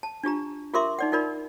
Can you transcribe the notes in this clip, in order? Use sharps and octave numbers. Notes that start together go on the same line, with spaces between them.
A5
D4 F4 G4 A#5
F4 G4 A#4 E5 C6 D6
D#4 D5 F#5
D#4 F4 A#4 D5 B5